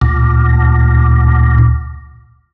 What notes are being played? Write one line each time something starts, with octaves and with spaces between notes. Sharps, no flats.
D2 A#2